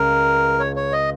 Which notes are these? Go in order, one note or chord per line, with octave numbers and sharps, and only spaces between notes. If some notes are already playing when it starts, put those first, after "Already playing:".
Already playing: C#2 C#3 A#4
C#5
C#5
D#5